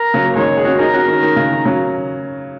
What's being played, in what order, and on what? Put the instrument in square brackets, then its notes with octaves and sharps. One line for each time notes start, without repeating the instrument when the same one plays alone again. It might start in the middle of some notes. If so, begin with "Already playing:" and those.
Already playing: [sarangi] A#4
[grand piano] C#3 F#3
A#3
[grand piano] D#3 G#3 [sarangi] C#5
[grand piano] G#4
C#4 F#4
[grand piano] D#4 G#4 [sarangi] A#4
[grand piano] C#4 F#4
D#3
D#3
C#3
D#3
C#3 F#3